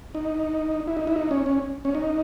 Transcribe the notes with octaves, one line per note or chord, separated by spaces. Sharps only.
D#4
E4
D#4
E4
D#4
C#4
C#4
C#4
D#4